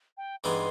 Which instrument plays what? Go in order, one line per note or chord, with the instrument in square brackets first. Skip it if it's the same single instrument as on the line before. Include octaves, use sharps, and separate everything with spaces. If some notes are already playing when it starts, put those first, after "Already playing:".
[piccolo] G5
[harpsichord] G2 E3 G#3 B3 D#4 [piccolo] C6